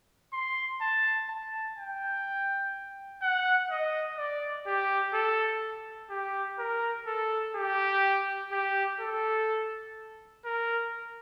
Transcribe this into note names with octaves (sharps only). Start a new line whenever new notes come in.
C6
A5
A5
G5
F#5
D#5
D5
G4
A4
G4
A#4
A4
G4
G4
A4
A#4